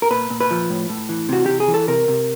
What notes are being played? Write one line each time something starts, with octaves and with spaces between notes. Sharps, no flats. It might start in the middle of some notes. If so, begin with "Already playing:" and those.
A#4
A#2 B4
A#2
B4
F3
A2
A2
E3
C3 F#4
C3 G4
G#4
E3
A4
C3 A#4
C3